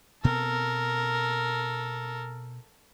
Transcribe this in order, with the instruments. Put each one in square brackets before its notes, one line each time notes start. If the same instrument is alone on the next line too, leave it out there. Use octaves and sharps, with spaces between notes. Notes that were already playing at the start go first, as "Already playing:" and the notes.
[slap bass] B2 B3 C4 [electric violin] A4 A#4